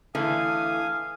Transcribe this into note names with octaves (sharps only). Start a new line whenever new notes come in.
D3 E3 A3 F5 G#5 D#6